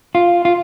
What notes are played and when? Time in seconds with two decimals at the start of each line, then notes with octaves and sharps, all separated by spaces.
0.15 F4
0.45 F4